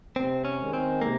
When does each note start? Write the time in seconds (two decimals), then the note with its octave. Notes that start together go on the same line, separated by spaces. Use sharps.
0.16 C3 C4
0.45 C#4
0.59 D#3 G#3
0.73 C4
1.01 C3 A#3